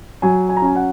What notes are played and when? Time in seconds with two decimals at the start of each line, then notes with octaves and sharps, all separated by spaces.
0.22 F#3 G#5
0.49 G#5
0.57 A#5
0.62 C#4 G#5
0.76 F#5